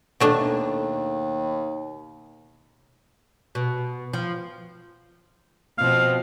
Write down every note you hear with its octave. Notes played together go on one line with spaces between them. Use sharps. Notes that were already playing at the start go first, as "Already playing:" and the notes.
D#2 B2 A3 D4
B2
F3
B2 F3 C4 F5